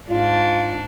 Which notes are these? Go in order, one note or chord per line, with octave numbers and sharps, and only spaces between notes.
G#2 D4 F4